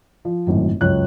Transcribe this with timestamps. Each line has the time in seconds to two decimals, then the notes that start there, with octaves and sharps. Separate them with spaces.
0.25 F3
0.47 G#1 F#2 A2
0.81 C#2 F#2 C#5 F#6